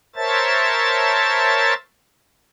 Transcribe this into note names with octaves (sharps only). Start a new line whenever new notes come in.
A#4 C5 C#5 E5 A5 A6